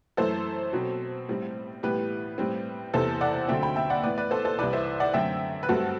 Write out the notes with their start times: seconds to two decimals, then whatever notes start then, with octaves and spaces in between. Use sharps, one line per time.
0.17 F#2 E3 A3 A4 C5
0.73 B2 F#3 C4
1.28 A2 G3 C4
1.83 A2 E3 G3 B3 G4 B4
2.38 A2 G3 C4
2.94 E2 C3 E3 A4 C5
3.21 D5 F#5
3.48 D2 D3 F#3 A3 C4 E5 G5
3.63 G5 B5
3.76 E5 G5
3.90 D5 F#5
4.03 A2 E3 B3 B4 D5
4.18 B4 D5
4.31 A4 C5
4.45 A4 C5
4.59 C2 C3 E3 B4 D5
4.73 C5 E5
5.00 D5 F#5
5.14 F#2 D3 A3 C4 E5 G5
5.63 B4
5.69 G2 F#3 A3 C4 F#4 A4